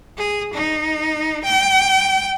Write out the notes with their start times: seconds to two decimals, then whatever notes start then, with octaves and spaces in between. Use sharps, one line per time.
0.18 G#4
0.54 D#4
1.45 G5